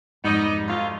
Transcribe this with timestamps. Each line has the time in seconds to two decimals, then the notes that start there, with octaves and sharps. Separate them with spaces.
0.24 F2 G#2 G3 B3 D#4
0.67 D2 F4